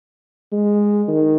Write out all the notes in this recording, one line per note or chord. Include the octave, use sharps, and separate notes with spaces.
G#3
D#3